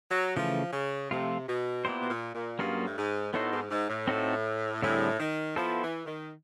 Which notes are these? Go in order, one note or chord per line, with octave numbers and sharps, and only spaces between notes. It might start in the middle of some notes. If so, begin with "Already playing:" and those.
F#3
C#3 E3 F3 A3
C#3
C3 F3 A3 C4 F4
B2
A#2 B3 E4 G4 C5
B2
A#2
A#2
G2 F#3 A#3 C#4 F4 G#4
A2
G#2
A2 B3 D#4 F#4 A4 C5
G#2
G#2
A2
C4 D#4 F#4 A4
A2 D3 G3 C4 E4 G#4
D#3
F3 B3 E4 A4 C5
E3
D#3